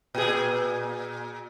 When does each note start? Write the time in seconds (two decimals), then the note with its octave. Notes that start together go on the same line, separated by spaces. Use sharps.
0.15 A#2 G#4